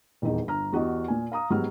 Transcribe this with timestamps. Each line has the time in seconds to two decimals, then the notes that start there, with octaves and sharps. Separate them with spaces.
0.22 D#1 E2 D#4 G#4
0.47 G1 A#5 F6
0.73 E2 F#4 G4 D#5
1.08 A#2 G#5
1.32 F5 A#5 D#6
1.50 G#2 F#3 B3 F#4 G4 F6